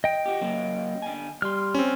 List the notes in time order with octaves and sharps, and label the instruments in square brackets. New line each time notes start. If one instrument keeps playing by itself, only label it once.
[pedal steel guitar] D#5 G5
[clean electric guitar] F#4 G4
F#3 A#3 C#4
D3 G#5
[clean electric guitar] G3 [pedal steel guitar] C6 F6
[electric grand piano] C4 C#4